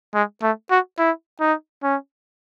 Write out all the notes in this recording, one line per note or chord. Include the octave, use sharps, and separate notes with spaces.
G#3
A3
F#4
E4
D#4
C#4